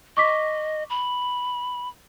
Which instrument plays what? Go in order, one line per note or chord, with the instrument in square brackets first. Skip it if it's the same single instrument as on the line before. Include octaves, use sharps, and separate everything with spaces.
[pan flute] D#5 [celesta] C#6 D6 B6
[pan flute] B5